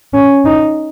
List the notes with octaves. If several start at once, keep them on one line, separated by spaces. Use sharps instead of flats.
C#4
D#4